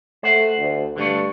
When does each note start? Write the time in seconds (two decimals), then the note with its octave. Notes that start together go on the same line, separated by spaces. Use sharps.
0.23 A3 C5 F#5
0.57 D2
0.96 G2 D3 A3